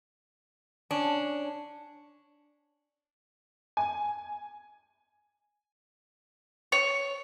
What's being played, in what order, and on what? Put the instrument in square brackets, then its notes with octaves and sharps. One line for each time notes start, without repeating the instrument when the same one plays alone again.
[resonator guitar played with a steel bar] C#4 D4
[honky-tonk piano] G#5
[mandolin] C#5